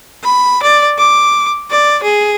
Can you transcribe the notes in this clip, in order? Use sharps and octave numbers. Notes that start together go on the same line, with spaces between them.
B5
D5
D6
D5
G#4